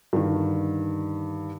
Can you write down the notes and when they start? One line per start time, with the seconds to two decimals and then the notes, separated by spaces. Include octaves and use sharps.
0.13 G2 D3 D#3